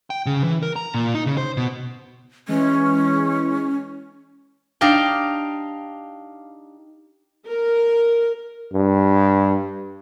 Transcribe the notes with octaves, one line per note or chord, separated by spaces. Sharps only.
G5
C#3
E3
A#4
A#5
A#2
D#4
C#3
C5
B2
E3 G#3 C#4
D4 D#4 G4 F5 G5
A#4
G2